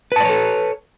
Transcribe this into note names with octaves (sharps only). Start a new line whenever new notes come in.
A4 B4 C#5 D5 A5